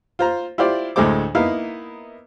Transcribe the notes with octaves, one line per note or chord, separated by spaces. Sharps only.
F4 C5 A#5
E4 F4 G4 C5 D5
D2 A2 G#3 A4 C5 D6
A#3 B3 D#4 E4 F5